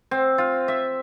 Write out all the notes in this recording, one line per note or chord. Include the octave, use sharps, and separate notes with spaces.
C4
F4
E5